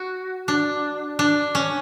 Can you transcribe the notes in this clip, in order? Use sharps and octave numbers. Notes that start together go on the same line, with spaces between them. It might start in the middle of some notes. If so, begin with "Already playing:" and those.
Already playing: F#4
D4
D4
C#4